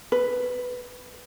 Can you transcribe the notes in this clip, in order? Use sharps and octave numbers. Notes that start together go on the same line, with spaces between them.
B4